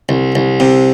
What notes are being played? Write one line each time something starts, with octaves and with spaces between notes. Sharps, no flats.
C2
C2
C3